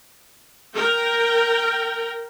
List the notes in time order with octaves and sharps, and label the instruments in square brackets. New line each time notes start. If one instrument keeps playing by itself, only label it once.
[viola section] A#4 G5